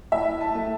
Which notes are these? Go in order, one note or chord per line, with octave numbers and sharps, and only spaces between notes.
A2 E5
A5
A3